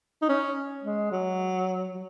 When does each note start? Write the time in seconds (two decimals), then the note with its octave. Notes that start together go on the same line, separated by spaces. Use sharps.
0.22 D#4
0.29 C#4
0.83 G#3
1.11 F#3
1.94 F#3